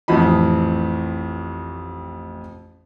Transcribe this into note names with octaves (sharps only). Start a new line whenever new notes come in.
A1 F2 E3 D#5 B5